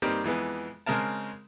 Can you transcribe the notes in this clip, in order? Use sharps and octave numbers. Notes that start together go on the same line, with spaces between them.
G2 A#3 C4 D#4 G4
F2 E3 G#3 B3
C#3 G#3 C4 A#4 A5